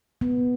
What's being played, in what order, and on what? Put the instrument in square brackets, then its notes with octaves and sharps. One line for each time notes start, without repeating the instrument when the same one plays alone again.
[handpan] B3